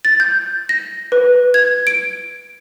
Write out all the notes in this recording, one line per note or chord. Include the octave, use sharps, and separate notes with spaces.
A6
G6
A#6
B4
G#6
D7